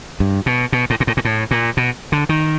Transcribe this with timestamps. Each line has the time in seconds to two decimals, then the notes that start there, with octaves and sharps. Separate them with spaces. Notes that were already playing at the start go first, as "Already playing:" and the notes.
0.20 G2
0.46 B2
0.72 B2
0.90 A2
1.00 A#2
1.07 A2
1.17 A#2
1.25 A2
1.51 A#2
1.77 B2
2.12 D3
2.29 D#3